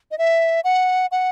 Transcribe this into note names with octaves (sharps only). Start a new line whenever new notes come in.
D#5
E5
F#5
F#5